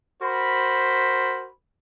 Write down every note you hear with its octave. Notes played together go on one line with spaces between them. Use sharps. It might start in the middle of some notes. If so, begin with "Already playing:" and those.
F#4 A#4 C5 B5